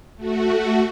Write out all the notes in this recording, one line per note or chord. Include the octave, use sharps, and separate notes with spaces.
A3 F#4